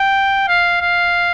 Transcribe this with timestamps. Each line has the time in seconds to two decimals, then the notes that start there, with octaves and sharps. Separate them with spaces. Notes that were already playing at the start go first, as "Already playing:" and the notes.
Already playing: G5
0.48 F5
0.81 F5